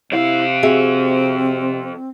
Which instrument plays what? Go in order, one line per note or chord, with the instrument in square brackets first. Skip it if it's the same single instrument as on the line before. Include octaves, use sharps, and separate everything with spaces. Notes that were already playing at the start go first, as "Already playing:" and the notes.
[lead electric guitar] F2 F5 [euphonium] C3 [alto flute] E4
[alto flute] C4 [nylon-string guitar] F#4 G#4 E5